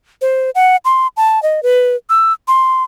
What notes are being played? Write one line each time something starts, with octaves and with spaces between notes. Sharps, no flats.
C5
F#5
C6
A5
D#5
B4
E6
C6